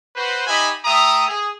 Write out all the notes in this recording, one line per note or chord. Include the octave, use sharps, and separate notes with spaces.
F#4 B4 C5
D#4 G4 D#5 E5 G#5 B5
A3 E5 G5 A#5 D#6
G#4